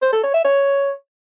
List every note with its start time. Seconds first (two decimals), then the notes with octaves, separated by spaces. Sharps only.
0.02 C5
0.13 A4
0.23 C#5
0.34 E5
0.44 C#5